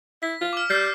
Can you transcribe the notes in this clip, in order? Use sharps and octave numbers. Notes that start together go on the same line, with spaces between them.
E4 B6
F4
D6 F6
G3 G6 C7